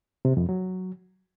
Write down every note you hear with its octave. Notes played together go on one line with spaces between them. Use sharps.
C3
F2
F#3